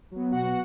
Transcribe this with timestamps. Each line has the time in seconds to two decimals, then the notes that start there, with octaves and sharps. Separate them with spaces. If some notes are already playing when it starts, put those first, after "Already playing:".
0.11 F#3 B3
0.31 B2 F#4 F#5